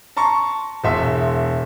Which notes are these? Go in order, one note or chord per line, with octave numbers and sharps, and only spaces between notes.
A5 A#5 C6 C#6
E1 E5 C6